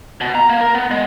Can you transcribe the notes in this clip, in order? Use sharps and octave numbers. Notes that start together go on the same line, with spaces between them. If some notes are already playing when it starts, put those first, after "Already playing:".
B2
A#5
A#3
A#4
B3
G#3